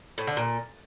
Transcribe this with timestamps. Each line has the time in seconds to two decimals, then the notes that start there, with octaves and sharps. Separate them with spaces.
0.18 A2
0.27 D3
0.37 A#2